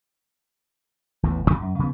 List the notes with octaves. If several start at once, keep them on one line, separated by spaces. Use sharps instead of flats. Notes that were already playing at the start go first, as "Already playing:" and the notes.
A1 E2 A2 E3
E1 A1 F2
F#2
C#3 F3 G#3 B3